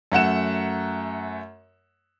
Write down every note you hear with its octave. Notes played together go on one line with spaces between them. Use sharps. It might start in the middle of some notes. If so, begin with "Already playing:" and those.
F#2 A3 F#5 E7